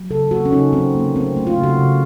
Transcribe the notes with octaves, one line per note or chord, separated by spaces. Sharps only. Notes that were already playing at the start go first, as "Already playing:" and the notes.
Already playing: F#3
C#3 A4
A#3 F#4
C#4
C#3 D#4
F#3 C4
C#3 A#3
A3 C4
A3
F4
C#3
F#4
C#3